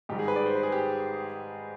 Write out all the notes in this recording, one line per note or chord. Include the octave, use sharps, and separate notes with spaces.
G#2 D#3 G3 G4
G#4
B4
D5
C5
B4
G#4
G4